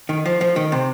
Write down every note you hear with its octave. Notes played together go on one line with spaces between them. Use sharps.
D#3
F3
F3
D#3
C3